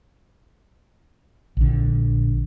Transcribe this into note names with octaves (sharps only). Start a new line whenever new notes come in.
A#1 D3